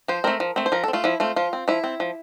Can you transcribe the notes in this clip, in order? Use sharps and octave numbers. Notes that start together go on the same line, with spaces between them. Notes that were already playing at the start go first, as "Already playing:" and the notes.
F3 C5
A3 C4 A#4
F3
A3 C4
C5
F3 A#4
C4 A4
A3 F4
F3 E4
A3 C4 F4
F3 F4
C4
F3 E4
C4
F3